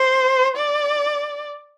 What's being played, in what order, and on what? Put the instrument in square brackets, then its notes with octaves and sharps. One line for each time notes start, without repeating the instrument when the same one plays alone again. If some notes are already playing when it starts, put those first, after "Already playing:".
Already playing: [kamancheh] C5
D5